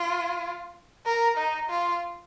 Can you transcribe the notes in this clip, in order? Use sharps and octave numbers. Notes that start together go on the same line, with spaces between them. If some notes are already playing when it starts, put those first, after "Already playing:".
Already playing: F4
A#4
D#4
F4